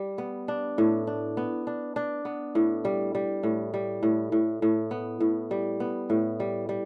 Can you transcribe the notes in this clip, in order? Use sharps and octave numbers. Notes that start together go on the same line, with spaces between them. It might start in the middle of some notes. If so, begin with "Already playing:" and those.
Already playing: G3
B3
D4
A2
D4
B3
D4
D4
B3
A2
G3
G3
A2
G3
A2
A2
A2
B3
A2
G3
B3
A2
G3
G3